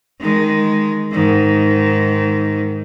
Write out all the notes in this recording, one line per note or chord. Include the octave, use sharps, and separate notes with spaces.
D#3 G#3
G#2 D#3